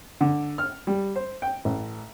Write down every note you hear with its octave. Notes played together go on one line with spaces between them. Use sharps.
D3
F6
G3
C5
G5
A1